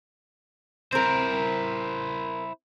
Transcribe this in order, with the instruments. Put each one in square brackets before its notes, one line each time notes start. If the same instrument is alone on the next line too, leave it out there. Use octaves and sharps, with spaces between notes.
[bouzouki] C4 A#4 [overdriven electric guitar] E4 C5